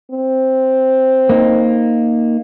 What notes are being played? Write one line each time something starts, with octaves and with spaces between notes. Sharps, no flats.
C4
A#3 D#4